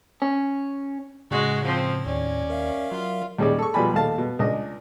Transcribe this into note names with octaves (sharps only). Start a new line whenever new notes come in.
C#4
A2 C#3 G#3 F#4
F3 C4
D#2 C#4 D5
A#4 E5 F5
F#3 F4
D#2 G3 C#4 G#4 D5
A4 C#6
B2 F3 G3 D5 G#5 B5
D#2 A3 F5 A5
B2
C#2 D4 D#5